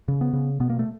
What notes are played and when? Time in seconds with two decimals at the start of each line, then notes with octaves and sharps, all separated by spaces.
0.08 C#3
0.21 B3
0.33 C#3
0.60 B2 B3
0.70 A#3
0.79 A3